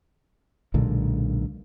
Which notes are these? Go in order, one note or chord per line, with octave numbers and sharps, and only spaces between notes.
B1 A#2 D3 G#3